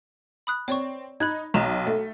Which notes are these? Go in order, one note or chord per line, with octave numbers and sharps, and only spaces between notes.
B5 D#6 F#6
C4 C#5 D5 C#6
D#4 B5 F#6 G#6
B1 D#5 A#5 E7
A3